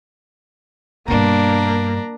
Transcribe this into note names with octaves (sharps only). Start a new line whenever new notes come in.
G2 B2 A#3 D4 A#5